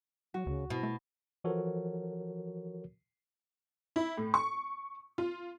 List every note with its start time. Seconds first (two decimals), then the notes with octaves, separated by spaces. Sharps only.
0.34 F#3 F#4
0.47 D2 C#3
0.70 B2 E4
0.83 A3
1.44 E3 F3 F#4 A4 A#4 C#5
3.96 E4
4.18 A2
4.34 C#6
5.18 F4